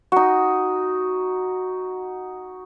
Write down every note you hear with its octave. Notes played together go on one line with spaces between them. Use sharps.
D#4 F#4